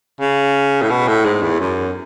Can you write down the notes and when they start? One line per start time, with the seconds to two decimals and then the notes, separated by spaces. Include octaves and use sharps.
0.21 C#3
0.82 A2
0.90 B2
1.08 A2
1.25 G#2
1.42 E2
1.60 F#2